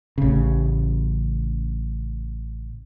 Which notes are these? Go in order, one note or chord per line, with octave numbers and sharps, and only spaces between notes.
A1 C#3